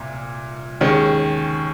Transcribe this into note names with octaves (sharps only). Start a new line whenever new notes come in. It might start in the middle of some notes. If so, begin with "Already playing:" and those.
Already playing: C2 A#2
D#2 D#3 G#3 C#4